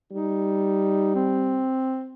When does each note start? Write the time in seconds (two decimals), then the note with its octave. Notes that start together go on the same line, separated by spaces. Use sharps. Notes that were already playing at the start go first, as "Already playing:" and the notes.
0.12 G3 D#4
1.15 C4